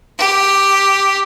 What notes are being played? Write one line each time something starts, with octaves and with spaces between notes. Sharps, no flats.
G4